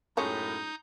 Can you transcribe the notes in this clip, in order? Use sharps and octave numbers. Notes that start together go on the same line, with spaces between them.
F#2 A2 F3 G#3 C#4 D#4 D#6 G6